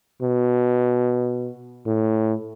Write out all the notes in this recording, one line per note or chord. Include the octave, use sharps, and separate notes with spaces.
B2
A2